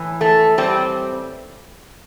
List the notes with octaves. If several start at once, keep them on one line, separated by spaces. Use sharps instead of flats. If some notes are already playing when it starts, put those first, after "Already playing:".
Already playing: A2 E3
A3
G3 C4